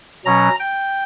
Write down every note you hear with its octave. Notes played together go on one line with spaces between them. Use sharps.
B2 F#3 C#4 A#5
G5